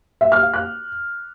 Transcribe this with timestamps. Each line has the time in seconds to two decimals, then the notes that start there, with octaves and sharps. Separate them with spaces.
0.21 E5
0.32 F6
0.43 F5
0.54 F#6